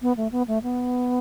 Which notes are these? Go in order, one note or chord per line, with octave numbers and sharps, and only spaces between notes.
B3
A3
B3
A3
B3